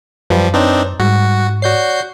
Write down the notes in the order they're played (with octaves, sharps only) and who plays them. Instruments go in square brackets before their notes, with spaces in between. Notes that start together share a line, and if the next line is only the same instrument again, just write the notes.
[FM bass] F#2 [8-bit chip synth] F3 G3 [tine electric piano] B4
[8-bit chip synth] C4 D4 D#4 [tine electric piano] B4 C#5
[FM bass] G#2 [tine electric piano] G3 [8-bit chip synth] F#4
[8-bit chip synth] F#4 G6 C7 [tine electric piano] C#5 D5